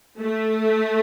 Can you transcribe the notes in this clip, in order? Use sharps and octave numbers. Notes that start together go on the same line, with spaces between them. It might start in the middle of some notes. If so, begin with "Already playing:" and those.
A3